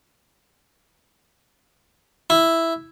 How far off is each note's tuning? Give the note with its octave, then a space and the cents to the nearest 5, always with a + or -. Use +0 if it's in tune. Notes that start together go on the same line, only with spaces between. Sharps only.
E4 +0